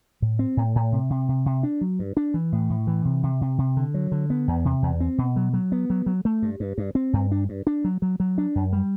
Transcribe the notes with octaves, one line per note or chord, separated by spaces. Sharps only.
A2
C4
A2
A2
C3
C3
C3
C3
D4
F#3
G2
D4
E3
A2
A2
E3
C3
C3
C3
C3
D3
F#3
D3
B3
E2
C3
E2
C4
B2
F#3
F#3
B3
F#3
F#3
A3
G2
G2
G2
C4
G2
D4
G2
D4
F#3
F#3
F#3
D4
F#2
G3